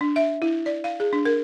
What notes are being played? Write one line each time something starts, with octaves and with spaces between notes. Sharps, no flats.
D4
E5
E4
D5
F5
G#4
D4
A#4